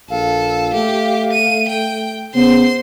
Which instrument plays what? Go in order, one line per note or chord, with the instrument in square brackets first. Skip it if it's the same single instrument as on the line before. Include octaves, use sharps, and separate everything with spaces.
[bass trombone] A#1 [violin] A4 [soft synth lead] F5
[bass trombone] A3 [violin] G4
[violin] D#7
G5
[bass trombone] C#3 [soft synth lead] B3 [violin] C5 C6